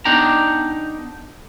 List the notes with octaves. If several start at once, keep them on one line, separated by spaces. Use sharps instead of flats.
B3 D4 D#4 D5 G5 A#5